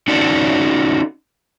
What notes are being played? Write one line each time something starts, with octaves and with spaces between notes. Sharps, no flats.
C#4 D#4 F#4 A4 D5